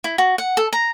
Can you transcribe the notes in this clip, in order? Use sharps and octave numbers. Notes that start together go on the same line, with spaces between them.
E4
F#4
F#5
A4
A#5